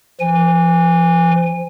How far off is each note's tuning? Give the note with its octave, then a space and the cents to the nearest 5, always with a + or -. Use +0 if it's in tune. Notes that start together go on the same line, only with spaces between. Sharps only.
F3 -30 G#5 -25